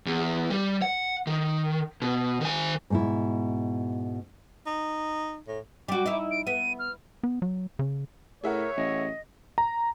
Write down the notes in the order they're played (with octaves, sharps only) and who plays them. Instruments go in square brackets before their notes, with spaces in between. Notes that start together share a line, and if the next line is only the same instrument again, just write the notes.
[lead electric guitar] E2
G3
F#5
D#3
B2
D#3 G#5
[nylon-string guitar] G#2 B2 E4
[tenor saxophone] D#4
A2
[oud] G3 F#4 [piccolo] D6
[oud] D#4 E4
[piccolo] D7
[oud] B3 [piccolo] D#7
[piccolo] F6
[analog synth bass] B3
F#3
C#3
[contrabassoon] A2 [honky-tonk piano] G#4 E5 F#5 [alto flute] A#4 [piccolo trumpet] C#5
[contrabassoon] A1 [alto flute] D#5
[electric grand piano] A#5